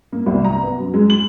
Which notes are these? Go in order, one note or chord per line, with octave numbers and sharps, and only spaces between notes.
A#3
C2
A#5
B3
F#2
G#3
F#7